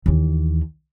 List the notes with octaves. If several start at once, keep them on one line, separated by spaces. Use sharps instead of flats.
D#2 E3